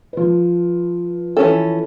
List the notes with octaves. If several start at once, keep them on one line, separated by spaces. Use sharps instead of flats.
F3 B4
E3 C#4 A4